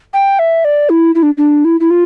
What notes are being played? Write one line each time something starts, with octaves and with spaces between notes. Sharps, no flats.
G5
E5
D5
E4
E4
D4
D4
E4
E4
F4